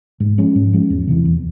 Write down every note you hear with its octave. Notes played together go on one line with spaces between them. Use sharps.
G#2
F3 G#3 C#4
G#2
F3 G#3 C#4
E2
C3 E3
E2